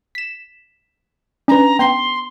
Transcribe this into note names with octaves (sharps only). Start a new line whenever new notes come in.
B6 E7
C#4 D4 B4 A#5
B3 G5 C6